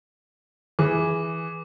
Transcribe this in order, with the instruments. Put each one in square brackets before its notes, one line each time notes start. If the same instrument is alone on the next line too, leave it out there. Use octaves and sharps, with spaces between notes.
[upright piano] E3 G#4 [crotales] D6